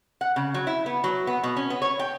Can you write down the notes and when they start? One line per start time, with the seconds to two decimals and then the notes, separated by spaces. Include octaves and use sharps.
0.21 F#5
0.36 C#3
0.54 F#3
0.67 E4
0.86 B3
1.04 F#3
1.27 B3
1.43 B2
1.57 C#4
1.70 B3
1.82 C#5
1.99 G5